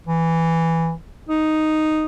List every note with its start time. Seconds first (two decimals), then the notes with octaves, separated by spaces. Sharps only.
0.07 E3
1.29 D#4